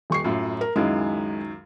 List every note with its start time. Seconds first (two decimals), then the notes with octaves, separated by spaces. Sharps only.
0.10 D#1 C#6 C7
0.24 F#2 A2 F4
0.61 A#4
0.76 C#2 F#2 D#3 G#3 E4